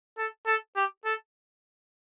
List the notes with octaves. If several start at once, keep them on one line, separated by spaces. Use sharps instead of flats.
A4
A4
G4
A4